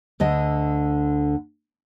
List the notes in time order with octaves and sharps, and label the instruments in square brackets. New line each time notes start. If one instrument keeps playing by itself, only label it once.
[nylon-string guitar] D2 D3 D#5